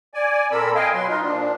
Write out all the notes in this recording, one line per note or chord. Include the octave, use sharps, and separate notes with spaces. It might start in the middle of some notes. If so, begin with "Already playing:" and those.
D5 G#5
A#2 C4 A4 A#4 B5 E6
D#5 F5 G5 G#5
B2 F#3 B4 C6
D#4 F4
A#2 F3 D4